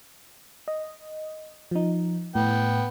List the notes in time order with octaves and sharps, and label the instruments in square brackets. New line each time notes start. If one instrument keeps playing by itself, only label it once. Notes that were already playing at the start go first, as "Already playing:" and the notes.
[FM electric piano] D#5
F3 D#4
[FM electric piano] A2 [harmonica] B3 G5